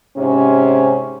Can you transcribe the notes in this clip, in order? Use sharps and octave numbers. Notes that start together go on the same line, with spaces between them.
G#2 C3 C#4